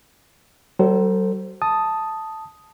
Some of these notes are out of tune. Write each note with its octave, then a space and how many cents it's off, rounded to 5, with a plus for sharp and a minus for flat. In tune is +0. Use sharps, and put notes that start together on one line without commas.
F#3 +40 A4 +35 C5 +0
A5 +0 D#6 +0